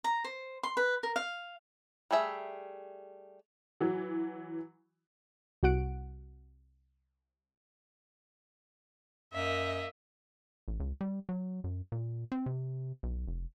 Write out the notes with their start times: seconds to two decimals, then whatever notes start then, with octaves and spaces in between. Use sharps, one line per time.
0.04 A#5
0.24 C5
0.63 C6
0.77 B4
1.03 A#4
1.16 F5
2.11 G3 A3 G#4 E5
3.81 E3 F#3
5.63 C2 F#4 F#5 D7
9.33 F#2 A#3 D#5 E5
10.68 A1
10.80 C#2
11.01 G3
11.29 F#3
11.64 F#2
11.92 A#2
12.32 C4
12.46 C3
13.03 B1
13.28 F1